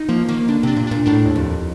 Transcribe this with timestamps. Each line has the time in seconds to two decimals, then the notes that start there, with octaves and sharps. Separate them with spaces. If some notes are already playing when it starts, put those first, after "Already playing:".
Already playing: D#4
0.09 F3 A#3
0.29 D#3 A#3
0.48 D3 D4
0.63 C3 D4
0.77 A#2
0.87 A#2 D4
1.06 A2 D4
1.25 D#2
1.36 F2
1.44 D#2